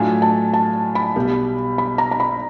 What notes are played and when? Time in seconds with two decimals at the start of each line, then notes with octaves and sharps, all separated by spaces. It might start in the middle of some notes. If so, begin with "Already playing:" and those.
Already playing: A2 F#3 A3 D4 F4 G#5
0.22 A5
0.54 A5
0.95 B5
1.16 B1 B2 G3 B3
1.78 B5
1.98 A#5
2.11 A#5
2.20 B5